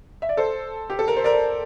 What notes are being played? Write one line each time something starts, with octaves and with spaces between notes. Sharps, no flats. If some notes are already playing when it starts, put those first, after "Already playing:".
E5
D5
A4 C5
G4
A4
A#4
C5
A#4 D5